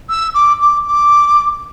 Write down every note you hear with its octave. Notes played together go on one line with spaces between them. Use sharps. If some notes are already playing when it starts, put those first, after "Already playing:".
E6
D6
D6
D6